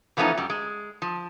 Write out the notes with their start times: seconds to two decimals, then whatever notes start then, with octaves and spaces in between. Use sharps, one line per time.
0.17 E3 F3 A3 B3 C#4 D#4
0.37 F#2 G3
0.50 G#3
1.02 F3